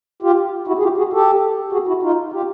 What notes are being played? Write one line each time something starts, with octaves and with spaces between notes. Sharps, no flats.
F4 G4
E4 F#4
G#4
F4 G4
F#4 G#4
G4 A4
F#4 G#4
E4 F#4
D#4 F4
F4 G4